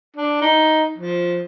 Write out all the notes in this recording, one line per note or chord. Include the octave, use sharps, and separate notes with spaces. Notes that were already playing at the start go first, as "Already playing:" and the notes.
D4
D#4
F3